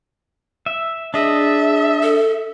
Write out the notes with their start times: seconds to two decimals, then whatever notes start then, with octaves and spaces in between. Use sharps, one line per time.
0.66 E5
1.14 D4 G#4 D#5 E5
2.03 A4